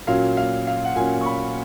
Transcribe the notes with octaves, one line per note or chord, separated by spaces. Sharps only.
A#2 F#3 C#4 F5
F5
F5
F#5
A#2 F#3 C#4 G#5
C#6
B5